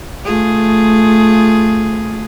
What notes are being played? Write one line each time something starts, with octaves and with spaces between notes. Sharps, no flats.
A3 F4 G#4